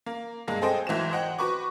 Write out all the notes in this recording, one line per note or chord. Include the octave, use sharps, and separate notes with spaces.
A#3
G2 G#3 A#3 A#6
C4 G#4 A4 C5 D#5 G5
G#1 E3 F#3 E7
C5 D#5 F#5 G5
F#4 B4 C#6 D6